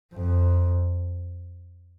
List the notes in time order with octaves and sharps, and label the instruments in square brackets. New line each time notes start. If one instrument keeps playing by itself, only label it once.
[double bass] F2